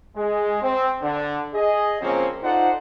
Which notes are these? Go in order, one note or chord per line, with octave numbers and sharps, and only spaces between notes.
G#3
C4
D3
G#4 D#5
C#3 F3 F#3 A#3 C4 C#4
D#4 F4 A4 C5 D5 F#5